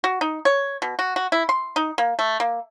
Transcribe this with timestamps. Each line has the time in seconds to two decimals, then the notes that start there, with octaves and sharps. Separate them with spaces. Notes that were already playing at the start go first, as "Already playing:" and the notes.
0.04 F#4
0.21 D#4
0.45 C#5
0.82 B2
0.99 F#4
1.16 F#4
1.32 E4
1.49 C6
1.76 D#4
1.98 A#3
2.19 A3
2.40 A#3